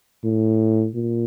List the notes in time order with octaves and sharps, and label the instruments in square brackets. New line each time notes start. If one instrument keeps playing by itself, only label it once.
[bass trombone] A2
A#2